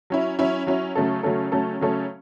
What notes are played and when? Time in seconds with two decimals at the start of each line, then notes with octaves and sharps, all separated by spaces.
0.10 F#3 C#4 E4
0.39 F#3 C#4 E4
0.67 F#3 C#4 E4
0.95 C#3 F#3 A3 C#4 A4
1.23 C#3 F#3 A3 C#4 A4
1.52 C#3 F#3 A3 C#4 A4
1.81 C#3 F#3 A3 C#4 A4